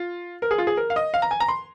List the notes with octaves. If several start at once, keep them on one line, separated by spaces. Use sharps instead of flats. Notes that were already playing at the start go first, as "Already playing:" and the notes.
Already playing: F4
A#4
G#4
F4
G#4
A#4
F5
D#5
F5
A#5
G#5
A#5
C6